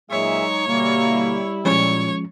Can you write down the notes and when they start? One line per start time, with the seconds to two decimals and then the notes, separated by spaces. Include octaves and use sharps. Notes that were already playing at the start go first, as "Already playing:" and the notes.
0.11 A#2 F#3 G#3 D#4 G#4 C#5 E5
0.66 B2 D3 G3 A#3 E4
1.65 A#2 F3 G#3 C#4 C#5